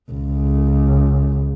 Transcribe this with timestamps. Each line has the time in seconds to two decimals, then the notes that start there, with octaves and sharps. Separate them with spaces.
0.11 C#2